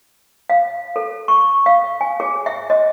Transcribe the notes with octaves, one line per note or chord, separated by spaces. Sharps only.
F5
A4
C#6
F5
G#5
G#4
E5
D#5